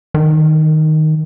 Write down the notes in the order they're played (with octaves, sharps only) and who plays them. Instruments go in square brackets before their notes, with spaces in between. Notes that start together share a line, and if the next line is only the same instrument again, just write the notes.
[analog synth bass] D#3